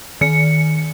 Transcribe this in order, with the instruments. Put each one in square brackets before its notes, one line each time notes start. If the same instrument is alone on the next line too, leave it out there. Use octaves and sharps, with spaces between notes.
[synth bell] D#3 C#7